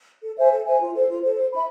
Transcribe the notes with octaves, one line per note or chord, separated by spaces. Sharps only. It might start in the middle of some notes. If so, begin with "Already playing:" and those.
A4
C5 E5 G#5
A4
C5 E5 G#5
F4
A4 C5
F4
A4 C5
C5
E5 B5